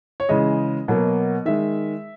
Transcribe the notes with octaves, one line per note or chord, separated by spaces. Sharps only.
C#5
C#3 E3 G#3 D#5
B2 F#3 A#3
D#3 G#3 E5